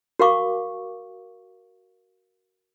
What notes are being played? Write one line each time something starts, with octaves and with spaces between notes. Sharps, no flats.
F#4 A#4 F5 C#6 D6